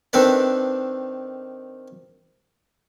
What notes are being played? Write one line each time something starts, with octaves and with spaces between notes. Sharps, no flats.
D#3 C4 D4 A4 B4 D5